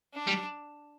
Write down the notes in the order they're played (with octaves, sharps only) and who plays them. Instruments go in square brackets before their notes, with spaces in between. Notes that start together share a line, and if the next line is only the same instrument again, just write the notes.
[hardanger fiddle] D4
[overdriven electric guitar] G3